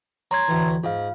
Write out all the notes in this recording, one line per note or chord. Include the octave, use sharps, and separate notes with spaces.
C#5 A#5 C6 G#6
D2 A2 E3
G#2 F4 F5